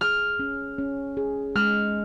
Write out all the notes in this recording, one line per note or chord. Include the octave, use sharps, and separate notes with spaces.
G#4 F6
C#4
C#4
G#4
G#3 F6